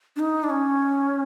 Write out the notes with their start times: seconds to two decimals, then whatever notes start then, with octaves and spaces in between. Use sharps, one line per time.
0.16 D4
0.20 D#4
0.44 D4
0.50 C#4